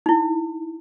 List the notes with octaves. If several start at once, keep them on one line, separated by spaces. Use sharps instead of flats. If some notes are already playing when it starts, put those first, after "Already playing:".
D#4 E4